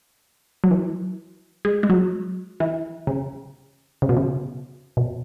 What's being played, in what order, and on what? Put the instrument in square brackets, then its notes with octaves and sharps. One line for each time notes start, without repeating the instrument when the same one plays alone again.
[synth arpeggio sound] F#3
E3
G#3
G#3
F#3
E3
C#3
C#3
B2
C#3
B2